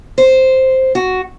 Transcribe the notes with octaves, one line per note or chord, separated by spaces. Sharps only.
C5
F#4